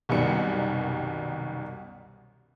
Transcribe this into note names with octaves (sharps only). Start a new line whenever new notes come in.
C2 F#2 B2 D#3 G3 C#7